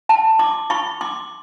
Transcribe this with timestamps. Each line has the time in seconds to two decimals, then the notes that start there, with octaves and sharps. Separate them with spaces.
0.09 A5 B5
0.39 C6 D6
0.70 B5 C#6
1.01 C6 D6